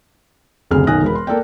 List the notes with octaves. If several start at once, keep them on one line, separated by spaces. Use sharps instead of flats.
F#1 D2 C3 G#4 F6
B1 D#3 G#5 D#6 F#6 A#6
E1 A#4 B5
C6
A#3 A4 D5 G5